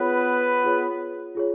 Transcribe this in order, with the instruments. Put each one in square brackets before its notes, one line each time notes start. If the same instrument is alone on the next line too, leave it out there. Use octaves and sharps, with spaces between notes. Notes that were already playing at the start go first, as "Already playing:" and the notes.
Already playing: [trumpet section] B3 B4 [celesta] F4 G#4 C#5
[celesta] F4 G#4 C#5
F4 G#4 C#5